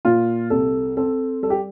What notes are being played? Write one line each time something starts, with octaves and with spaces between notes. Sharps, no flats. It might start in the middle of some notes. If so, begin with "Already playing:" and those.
A#2 F4
C2 A4
C4 A4
G3 A4
G4